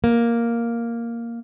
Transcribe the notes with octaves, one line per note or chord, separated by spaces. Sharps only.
A#3